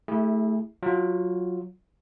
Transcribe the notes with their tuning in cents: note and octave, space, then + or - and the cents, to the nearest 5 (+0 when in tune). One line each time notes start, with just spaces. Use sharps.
A3 +0 E4 -20 G#4 -45
F#3 -10 F4 +0